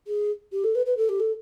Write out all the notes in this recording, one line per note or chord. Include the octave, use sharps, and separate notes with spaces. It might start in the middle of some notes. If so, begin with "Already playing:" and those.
G#4
G4
A4
B4
B4
A4
G4
A4